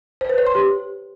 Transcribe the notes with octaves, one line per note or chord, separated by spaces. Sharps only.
C5
B4
C#5
C6
G4